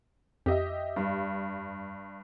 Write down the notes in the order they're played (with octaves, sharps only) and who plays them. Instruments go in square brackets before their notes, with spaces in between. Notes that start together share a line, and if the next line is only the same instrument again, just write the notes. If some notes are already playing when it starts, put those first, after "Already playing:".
[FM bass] F2 [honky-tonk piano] G4 D#5 E5
[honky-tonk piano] G2